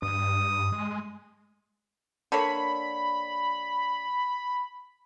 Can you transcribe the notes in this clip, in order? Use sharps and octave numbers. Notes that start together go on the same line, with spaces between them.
G2 D#6
G#3
D3 A#3 C#5 B5